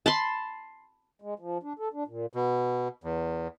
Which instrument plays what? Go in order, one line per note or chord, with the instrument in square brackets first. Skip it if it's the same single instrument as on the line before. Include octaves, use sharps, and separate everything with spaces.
[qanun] A5 B5 C6
[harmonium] G#3
F3
D4
A4
D4
A#2
[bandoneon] B2
E2